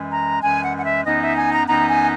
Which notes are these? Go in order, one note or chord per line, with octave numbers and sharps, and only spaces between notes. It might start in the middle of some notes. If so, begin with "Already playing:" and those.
Already playing: F#2 E3 G#3
A#5
F#2 E3 G#3 G#5
F#5
F#5
E5
F#2 E3 B3 D#4 D#5
E5
G#5
A#5
F#2 E3 B3 D#4 A#5
G#5